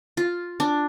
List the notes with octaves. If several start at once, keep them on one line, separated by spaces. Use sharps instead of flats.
F4
D4